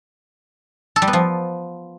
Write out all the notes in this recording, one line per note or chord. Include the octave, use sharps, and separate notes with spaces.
A4
G3
B3
F3